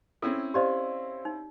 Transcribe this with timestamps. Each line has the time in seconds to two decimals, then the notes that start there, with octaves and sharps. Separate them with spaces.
0.22 C4 C#4 E4 A4
0.54 G4 C5 D5 D#5 F5 C6
1.25 D#4